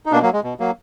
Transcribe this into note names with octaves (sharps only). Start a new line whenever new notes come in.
D#4
B2 A#3 D4
F#3 A#3
G#3
B2
F#3 A#3